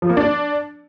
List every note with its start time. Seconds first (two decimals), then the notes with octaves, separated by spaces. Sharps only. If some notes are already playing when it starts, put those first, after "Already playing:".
0.02 F3
0.10 A#3
0.17 D4